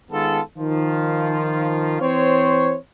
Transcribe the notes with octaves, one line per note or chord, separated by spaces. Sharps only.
D#3 G#3 B3 F4 A4
D#3 F3 F4
E3 C4 C5 C#5